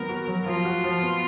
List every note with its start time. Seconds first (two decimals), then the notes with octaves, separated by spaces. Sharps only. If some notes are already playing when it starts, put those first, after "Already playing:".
Already playing: D#3 F#3 B3 A#4
0.09 F#4
0.28 F#3
0.46 F3 F4
0.65 F#4
0.84 F3
1.02 B3